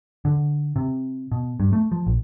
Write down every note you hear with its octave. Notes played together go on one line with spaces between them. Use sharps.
D3
C3
B2
G2
A3
F3
A#1